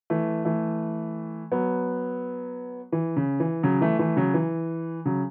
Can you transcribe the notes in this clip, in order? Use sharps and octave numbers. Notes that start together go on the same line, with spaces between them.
E3 A3
E3 A3
F#3 B3
E3
C#3
E3
C#3 F#3
E3 A3
E3 A3
C#3 F#3
E3
C#3 F#3